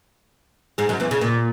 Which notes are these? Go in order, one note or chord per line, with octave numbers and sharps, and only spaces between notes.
G#2 G#3
F#2 F#3
E2 E3
C#3
A#2